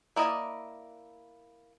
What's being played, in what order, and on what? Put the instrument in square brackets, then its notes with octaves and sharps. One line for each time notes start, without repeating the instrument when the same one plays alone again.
[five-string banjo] A#3 E4 D5 D#5